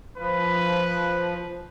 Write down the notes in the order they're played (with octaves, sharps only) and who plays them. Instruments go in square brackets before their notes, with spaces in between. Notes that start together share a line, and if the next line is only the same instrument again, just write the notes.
[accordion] F3 [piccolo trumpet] B4